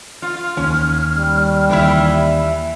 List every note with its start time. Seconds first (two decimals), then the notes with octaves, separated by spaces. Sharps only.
0.22 F4 F6
0.57 D#2 C#4
1.18 G3
1.69 D#2 E3 E4 E5